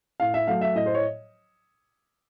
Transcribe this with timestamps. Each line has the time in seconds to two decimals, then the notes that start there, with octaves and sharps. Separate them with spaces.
0.20 A2 F5
0.34 E5
0.47 F#3 A3 F5
0.61 E5
0.75 A2 D#5
0.86 C5
0.94 C#5